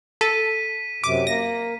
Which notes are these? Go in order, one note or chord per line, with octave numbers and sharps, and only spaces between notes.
A4 B6 D#7
F#2 C3 D6
A#3 A#6